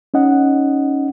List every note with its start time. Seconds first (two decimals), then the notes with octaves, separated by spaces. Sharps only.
0.14 C#4 D#4 D#5 F#5